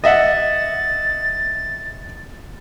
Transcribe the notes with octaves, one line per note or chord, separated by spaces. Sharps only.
D#5 E5 F#5 A6